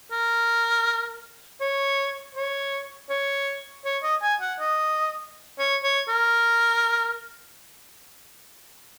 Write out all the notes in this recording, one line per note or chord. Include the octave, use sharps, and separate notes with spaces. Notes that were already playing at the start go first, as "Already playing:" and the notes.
A#4
C#5
C#5
C#5
C#5
D#5
G#5
F#5
D#5
C#5
C#5
A#4